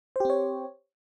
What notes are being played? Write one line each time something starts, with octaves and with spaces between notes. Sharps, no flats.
C4 G4 C5 C#5